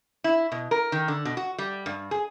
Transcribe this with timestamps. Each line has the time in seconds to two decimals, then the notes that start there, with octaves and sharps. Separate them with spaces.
0.24 E4
0.52 B2
0.71 A#4
0.92 D#3
1.08 D3
1.25 B2
1.37 F#4
1.58 G3
1.86 G2
2.11 G#4